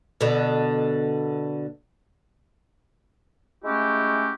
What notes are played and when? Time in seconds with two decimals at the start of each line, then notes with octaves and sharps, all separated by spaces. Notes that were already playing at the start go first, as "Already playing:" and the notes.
0.21 B2 D3
3.64 G#3 A3 C#4 E4 F#4 G4